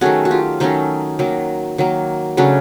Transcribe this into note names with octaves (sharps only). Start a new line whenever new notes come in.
D#3 F#3 A3 C#4 F#4 G#4
F#4
F4 G4
D#3 F#3 A3 C#4 D#4
D#3 F#3 A#3
D#3 F#3 A#3
C#3 F#3 A3 C#4 D4